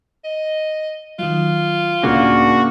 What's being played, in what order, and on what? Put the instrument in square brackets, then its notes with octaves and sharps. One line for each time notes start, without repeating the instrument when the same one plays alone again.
[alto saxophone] D#5
[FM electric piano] D#3 F#3 [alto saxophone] F4
[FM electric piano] C#2 A2 [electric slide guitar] C#3 A#3 [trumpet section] D4 F#4